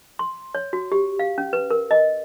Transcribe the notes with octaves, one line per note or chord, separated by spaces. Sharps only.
C6
C#5
F#4
G4
F5
C#4
B4
A#4
D#5